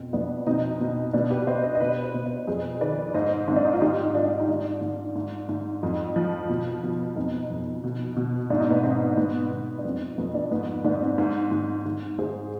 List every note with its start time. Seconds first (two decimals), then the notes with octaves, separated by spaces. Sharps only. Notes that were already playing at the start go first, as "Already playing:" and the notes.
Already playing: F2 B2 C4
0.13 F2 B3 D4
0.46 B2 C4 D#4
0.80 B2
1.13 B2 B3 D4
1.30 G4 B4
1.47 B2 C5 D#5
1.63 C5 D#5
1.75 D#5
1.80 B2 B4 D5
2.03 C5 D#5
2.14 B2
2.25 B4 D5
2.47 F2 G#4 C5
2.81 D#3 B4 D5
3.14 G#2 C5 D#5
3.48 G#2 C4
3.56 D4
3.65 D#4
3.73 F4
3.81 G#2 D#4 G4
4.15 G#2 D4 F4
4.31 D4
4.40 D#4
4.48 G#2 D4 F4
4.81 G#2
5.16 G#2
5.49 G#2
5.83 F2
6.16 F3
6.49 B2
6.83 B2
7.16 F2 C4 D#4
7.50 F2
7.84 B2
8.16 B2
8.50 G#2 D4
8.60 D#4
8.70 B3 D4
8.83 G#2 C4
9.17 G#2 B3
9.51 G#2
9.78 D4
9.85 F2 C4
10.18 F2 B3
10.34 B3 D4
10.51 G#2 B3
10.85 G#2 B3 D4
11.02 C4
11.18 G#2
11.52 G#2
11.86 G#2
12.19 G#2 G#4 C5